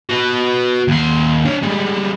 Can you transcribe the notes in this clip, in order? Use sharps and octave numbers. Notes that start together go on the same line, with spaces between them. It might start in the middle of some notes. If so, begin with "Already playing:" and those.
F#4 B4
D#2 C6
D4 C#5
G3 G#3